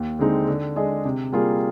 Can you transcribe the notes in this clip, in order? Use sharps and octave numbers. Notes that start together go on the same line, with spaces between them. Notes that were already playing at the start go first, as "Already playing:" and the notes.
Already playing: D#2
D3 G#3 C4 D#4
D3
G#3 D4 G#4 D#5
C3
G3 A#3 F4 G#4